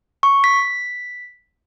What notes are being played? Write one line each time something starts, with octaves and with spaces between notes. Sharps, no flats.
C#6
B6